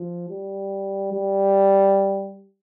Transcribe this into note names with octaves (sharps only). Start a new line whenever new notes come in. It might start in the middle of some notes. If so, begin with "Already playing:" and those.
Already playing: F3
G3
G3